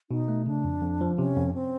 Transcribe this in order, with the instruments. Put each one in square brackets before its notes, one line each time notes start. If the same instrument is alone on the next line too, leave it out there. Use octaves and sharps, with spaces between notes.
[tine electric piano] B2 [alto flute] D#4
[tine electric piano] A3
[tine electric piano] C#3 [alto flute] D4
[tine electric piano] F2
F2
F3
[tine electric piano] C3 [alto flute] C#4
[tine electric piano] F2
[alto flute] C4